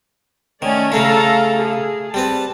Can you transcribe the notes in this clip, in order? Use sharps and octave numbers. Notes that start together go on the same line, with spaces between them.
D#3 A3 C#4 D5
C#3 A3 C#4 A4 F5 A#5
G#4
G3 C4 B4 A5